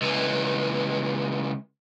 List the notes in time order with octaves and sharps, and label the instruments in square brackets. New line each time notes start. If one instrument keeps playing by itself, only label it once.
[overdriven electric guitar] C#2 E3